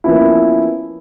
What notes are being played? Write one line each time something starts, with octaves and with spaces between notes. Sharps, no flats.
F3 A#3 B3 C#4 E4